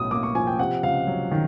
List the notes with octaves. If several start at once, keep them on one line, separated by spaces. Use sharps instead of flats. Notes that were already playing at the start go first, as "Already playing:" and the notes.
Already playing: B1 A2 D#6
A#3 D6
C#6
F3 G#5
G5
C3 F#5
C#2 F5
F#3
D#3